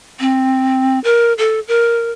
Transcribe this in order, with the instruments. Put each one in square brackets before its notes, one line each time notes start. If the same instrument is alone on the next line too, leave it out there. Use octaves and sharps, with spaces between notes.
[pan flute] C4
A#4
A4
A#4